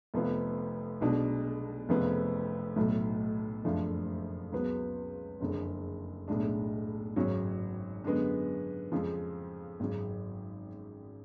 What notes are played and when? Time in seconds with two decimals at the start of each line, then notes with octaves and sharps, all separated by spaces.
0.14 F1 F2 F3 B3
1.01 B1 B2 G#3 D4
1.89 F1 F2 C#3 F3 B3
2.76 B1 A2 F#3
3.64 F#1 F2 F3 A3 D4
4.52 C#2 C#3 F#3 B3
5.40 F#1 F2 D3 G#3 C#4
6.28 B1 A2 G#3 D4
7.16 G#1 F#2 C#3 F#3 C#4
8.04 F#2 D3 G#3 B3
8.92 F2 C#3 F3 G#3
9.80 G#1 F#2 C#3